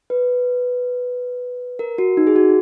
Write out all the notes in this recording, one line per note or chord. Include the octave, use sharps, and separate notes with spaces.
B4
A#4
F#4
D#4
G#4
F#4